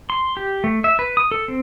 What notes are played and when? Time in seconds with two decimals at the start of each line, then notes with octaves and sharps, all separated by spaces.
0.10 C6
0.37 G4
0.64 A3
0.84 E5
0.99 B4
1.17 D#6
1.31 A4
1.48 C4